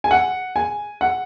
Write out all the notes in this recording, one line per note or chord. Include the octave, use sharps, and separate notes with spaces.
G#5
F#5
G#5
F#5